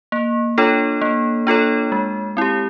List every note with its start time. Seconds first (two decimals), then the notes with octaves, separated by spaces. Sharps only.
0.12 A#3
0.58 D4 F4 A4 C#5
1.02 A#3
1.47 D4 F4 A4 C#5
1.92 G#3
2.37 C4 E4 G4